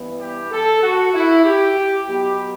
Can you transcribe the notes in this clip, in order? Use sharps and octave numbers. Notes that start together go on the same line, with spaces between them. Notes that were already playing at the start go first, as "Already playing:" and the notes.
Already playing: G2 E3 B3
G4
A4
F#4
E4
G4
B2 F#3 B3 G4